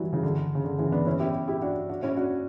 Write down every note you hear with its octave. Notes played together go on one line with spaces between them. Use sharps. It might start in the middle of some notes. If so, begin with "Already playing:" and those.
Already playing: E3 F#3 G3
C#3 E3
D3
C#3
D3
C#3 E3
B3 D4
C#4 E4
E4 G4
E4 G4
D4 F#4
D4 F#4
C#4 E4
D4 F#4